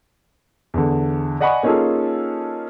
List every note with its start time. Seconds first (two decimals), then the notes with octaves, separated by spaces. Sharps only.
0.74 E2 D3
1.40 D5 D#5 F#5 G#5 B5 C#6
1.63 A#3 C#4 D#4 F4 G#4 A4